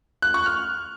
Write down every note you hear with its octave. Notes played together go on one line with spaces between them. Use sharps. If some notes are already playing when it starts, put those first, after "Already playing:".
F#6
C#6
F6